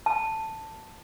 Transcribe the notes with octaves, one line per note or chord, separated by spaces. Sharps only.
A5